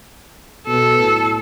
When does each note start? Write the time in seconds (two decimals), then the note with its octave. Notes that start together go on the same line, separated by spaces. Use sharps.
0.68 B2 A4
0.99 A2